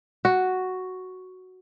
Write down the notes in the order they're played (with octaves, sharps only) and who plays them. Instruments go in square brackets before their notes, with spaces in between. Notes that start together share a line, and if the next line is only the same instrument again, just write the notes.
[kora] F#4